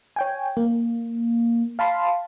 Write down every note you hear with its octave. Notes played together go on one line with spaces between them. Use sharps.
C#5 G5 G#5
A#3
F5 A5 B5 C6